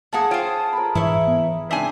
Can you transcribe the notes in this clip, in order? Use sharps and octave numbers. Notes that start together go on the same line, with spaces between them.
F#2 A#3 G#4 F#5 A5
F4 C5 C#5 G5 G#5
A#4 B5
G#2 E3 E4 C#5
B3
C#2 C4 D4 D#4 E5 G#5